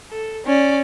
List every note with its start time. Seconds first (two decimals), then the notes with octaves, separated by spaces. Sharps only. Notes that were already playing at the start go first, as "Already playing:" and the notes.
0.12 A4
0.46 C#4 D5